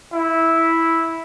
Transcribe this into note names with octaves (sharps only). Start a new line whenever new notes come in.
E4